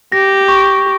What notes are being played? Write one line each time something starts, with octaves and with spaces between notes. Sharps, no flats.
G4 A#6
C#6